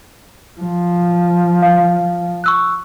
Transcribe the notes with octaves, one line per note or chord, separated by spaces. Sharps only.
F3
F5
C#6 E6 F#6